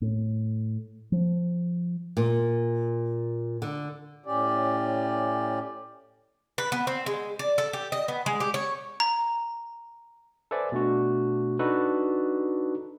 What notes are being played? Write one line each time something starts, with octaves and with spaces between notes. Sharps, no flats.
A2
F3
A#2
D3
A2 C#4 G4 D5
B4
B3
C4
G#3
D5
A4
G4
D#5
B3
G#3
G4
C#5
A#5
A4 B4 C5 D5 E5 G#5
B2 A3 D4 F#4
D4 D#4 F#4 A4 B4